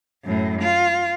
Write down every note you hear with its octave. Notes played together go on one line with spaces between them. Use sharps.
F#2 A2
F4